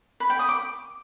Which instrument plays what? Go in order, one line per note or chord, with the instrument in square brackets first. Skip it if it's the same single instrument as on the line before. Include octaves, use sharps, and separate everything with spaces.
[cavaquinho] B4
G5
D#6
D6